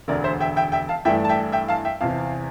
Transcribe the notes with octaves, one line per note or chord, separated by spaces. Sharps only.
E1 D2 D3 A#4 D5
C5 E5
E5 G5
E5 G5
E5 G5
F5 A5
G2 E3 A3 D4 E5 G5
A5
E5 G5
E5 G5
F5 A5
E5 G5
E2 C3 E3 F5 A5